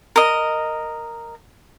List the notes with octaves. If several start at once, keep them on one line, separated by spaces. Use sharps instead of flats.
A#4 D#5